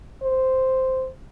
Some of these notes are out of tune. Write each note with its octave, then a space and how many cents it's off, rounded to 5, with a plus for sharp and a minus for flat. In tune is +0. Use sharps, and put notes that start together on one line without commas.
C5 -5